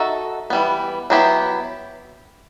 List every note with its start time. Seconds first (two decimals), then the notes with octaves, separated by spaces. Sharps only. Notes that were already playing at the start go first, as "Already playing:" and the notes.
Already playing: D#4 F#4 A4 E5
0.50 E3 G3 B3
1.10 F#3 B3 E4 G4